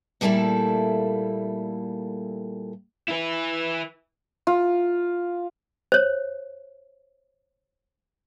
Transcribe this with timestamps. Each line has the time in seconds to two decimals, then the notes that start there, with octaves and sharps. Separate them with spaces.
0.21 A#2 G3 A3 A#3 E4 A4
3.08 E4 B4
4.47 F4
5.92 C5 C#5